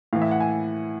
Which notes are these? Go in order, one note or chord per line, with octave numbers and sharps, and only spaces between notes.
A2 E3 F5
E5
F#5
G#5